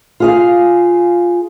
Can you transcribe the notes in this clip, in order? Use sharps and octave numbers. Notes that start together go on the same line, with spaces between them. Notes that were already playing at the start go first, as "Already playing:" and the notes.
F4 G#4 F5